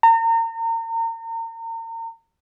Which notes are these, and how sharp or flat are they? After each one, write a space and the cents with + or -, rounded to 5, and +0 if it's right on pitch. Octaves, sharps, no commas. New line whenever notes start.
A#5 -35